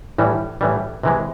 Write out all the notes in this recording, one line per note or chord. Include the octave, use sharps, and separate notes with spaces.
A2 E3 G3
A2 E3 G3
C3 E3 G#3